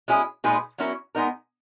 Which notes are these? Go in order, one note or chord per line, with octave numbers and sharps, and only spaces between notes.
G#3 C#4 E4 G#4
A#2 G#3 D#4 G#4 B4
F#3 C#4 E4 A#4
G#3 B3 D#4 A#4